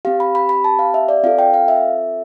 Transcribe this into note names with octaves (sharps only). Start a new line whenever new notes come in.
C4 G4 F5
B5
B5
B5
A5
F5
E5
D5
C4 F4 A4 F5
G5
F5
E5